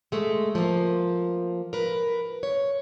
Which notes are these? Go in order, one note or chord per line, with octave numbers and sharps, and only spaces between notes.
G#3 A3
F3 A#3
A#4 B4
C#5